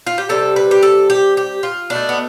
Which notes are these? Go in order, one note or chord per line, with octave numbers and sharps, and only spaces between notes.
F4
G4
C3 G3 A4
B4
G4
A4
G4
G4
F4
B2 A3 D4
B3